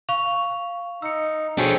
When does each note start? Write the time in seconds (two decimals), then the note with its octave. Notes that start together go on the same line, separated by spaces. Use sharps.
0.09 F5 C#6 F7
1.02 D#4 E6 C#7
1.58 D4 F#4 G#4 A4 C5 C#5 G5